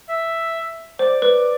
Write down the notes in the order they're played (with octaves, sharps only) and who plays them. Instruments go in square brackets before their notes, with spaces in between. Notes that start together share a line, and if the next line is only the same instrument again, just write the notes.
[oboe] E5
[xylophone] C5 [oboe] D5
[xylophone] B4